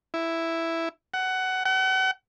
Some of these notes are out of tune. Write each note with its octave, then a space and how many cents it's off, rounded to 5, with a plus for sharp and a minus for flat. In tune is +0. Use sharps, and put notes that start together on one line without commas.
E4 +0
F#5 +15
F#5 +35